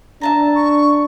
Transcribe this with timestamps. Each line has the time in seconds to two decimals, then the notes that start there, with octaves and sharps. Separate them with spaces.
0.21 D4 E5 A5 A#5
0.55 C#6